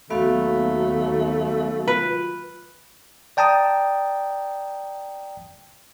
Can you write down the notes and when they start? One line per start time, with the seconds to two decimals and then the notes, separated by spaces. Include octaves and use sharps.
0.10 D#2 F#3 A3 B3 F#4 F5
1.88 F4 B4
3.37 D5 G5 A5 A#5 D#6